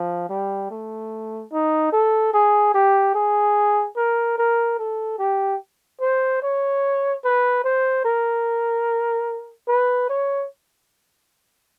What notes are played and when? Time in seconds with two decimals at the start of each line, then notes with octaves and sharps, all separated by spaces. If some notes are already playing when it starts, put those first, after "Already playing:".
Already playing: F3
0.29 G3
0.71 A3
1.52 D#4
1.93 A4
2.33 G#4
2.74 G4
3.15 G#4
3.97 A#4
4.38 A#4
4.79 A4
5.19 G4
6.01 C5
6.43 C#5
7.24 B4
7.64 C5
8.05 A#4
9.68 B4
10.09 C#5